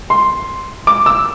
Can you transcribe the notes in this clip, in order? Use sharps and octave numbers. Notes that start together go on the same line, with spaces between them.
C6
D6
E6